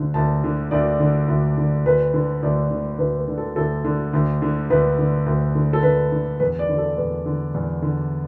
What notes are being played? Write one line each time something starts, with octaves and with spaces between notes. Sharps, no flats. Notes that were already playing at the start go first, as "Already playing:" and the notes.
Already playing: D2 D3
D2 A5
D3
D2 D5
D3
D2
D3
D2 B4
D3
D2 D5
D3
D2 B4
B4
D3
A4
D2 A4
D3
D2
D3
D2 B4
D3
D2
D3
A4
D2 B4
D3
E2 B4
D5
D3
A4
E2 B4
D3
E2
D3